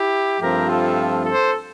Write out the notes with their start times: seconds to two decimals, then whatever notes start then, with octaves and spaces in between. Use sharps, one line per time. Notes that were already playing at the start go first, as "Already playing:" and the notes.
Already playing: E4 G4
0.40 G2 F3 A3 C4 G4 A#4
0.69 F4 A4
1.25 A4 C5